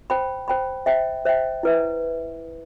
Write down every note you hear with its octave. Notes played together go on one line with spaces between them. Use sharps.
C5 G5 B5
C5 G5 B5
C5 E5 G5
C5 E5 G5
E4 B4 E5